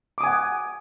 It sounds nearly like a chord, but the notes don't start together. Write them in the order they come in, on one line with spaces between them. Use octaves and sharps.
D6 D#6 G#5 F#5